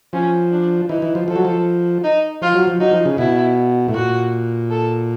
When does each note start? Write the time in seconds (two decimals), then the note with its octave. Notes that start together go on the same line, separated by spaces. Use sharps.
0.13 F3 C#4
0.52 D4
0.89 E3 D#4
1.02 E3
1.15 F3
1.28 F3 A4
1.36 F#3
1.45 F3
2.04 D#4
2.42 F3 F4
2.55 F#3
2.68 F3
2.80 F#3 D#4
2.93 F3
3.06 C#3
3.18 B2 E4
3.88 A2
3.94 A#2 F#4
4.70 A4